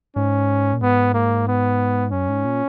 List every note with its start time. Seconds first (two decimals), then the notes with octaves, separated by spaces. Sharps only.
0.16 G#2 C#4
0.73 A#2
0.81 G#2 B3
1.14 A#3
1.48 B3
2.12 F#2 C#4
2.29 G#2
2.45 A#2